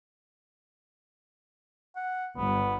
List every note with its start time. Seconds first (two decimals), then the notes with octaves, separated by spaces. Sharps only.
1.96 F#5
2.37 G1 B3